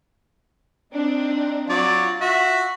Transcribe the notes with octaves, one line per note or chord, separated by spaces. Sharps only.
C4 D4 D#4
F#3 F4 D5
F#4 E5